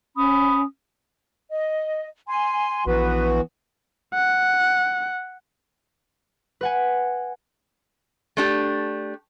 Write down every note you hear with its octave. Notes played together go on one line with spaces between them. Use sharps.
C#4 B5 D#6
D#5
G#5 C6
A#1 E3 B3 F#4 B4
F#5
B4 F#5 G#5
A3 D4 G4